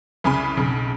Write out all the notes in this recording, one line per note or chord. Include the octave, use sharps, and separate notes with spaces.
C2 C#3 G#5 B5
B1 C#3